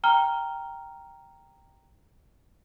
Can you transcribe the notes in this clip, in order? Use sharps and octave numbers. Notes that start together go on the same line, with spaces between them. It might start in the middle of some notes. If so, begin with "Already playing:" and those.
G5 A#5 F6 G7